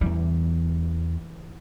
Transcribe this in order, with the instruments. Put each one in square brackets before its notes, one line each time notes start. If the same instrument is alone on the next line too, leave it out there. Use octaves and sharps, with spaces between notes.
[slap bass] E2 G3 [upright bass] E3